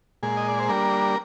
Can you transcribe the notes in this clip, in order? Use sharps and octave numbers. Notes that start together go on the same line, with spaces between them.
A#2 G#3 G#4
D#5
D5
C5
G3 A#3 D4 A#4